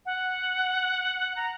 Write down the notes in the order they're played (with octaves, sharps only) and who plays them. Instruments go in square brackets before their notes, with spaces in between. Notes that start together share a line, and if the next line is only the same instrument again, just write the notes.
[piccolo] F#5
A#5